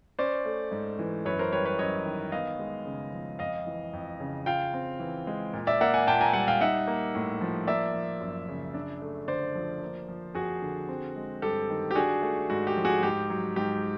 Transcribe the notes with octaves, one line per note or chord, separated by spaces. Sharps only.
C#4 C5 D5
A3
G#2
E3
F#2 B4 C#5
A#4 C5
G3 B4 C#5
B4 C#5
F#2 C#5 D#5
D#3
B3 D#5 F5
G#3
C#3
F3
F2 D#5 F5
E3
F2
C#3
F4 F5 G5
C4
E3
G#3
A#2
D5 E5
A#3 E5 F#5
F#5 G#5
A#2 G5 A5
G#5 A#5
G3 F#5 G#5
F5 G5
D#4 E5 F#5
A#3
A2
F3
A#3 D5 E5
F3
F#2
C#3
D4
A3
D3 C5 D5
F3
A#3
F3
F2 F#4 G#4
D3
C4
G#3
G2 G4 A4
D#3
G4
D4 F#4 G#4
A3
G#2 F#4
G4
F3
F#4 G#4
G#2 G4
F#3
G#2 G4